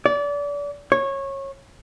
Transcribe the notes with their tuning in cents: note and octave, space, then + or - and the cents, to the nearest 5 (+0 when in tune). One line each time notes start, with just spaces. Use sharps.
D5 -30
C#5 -20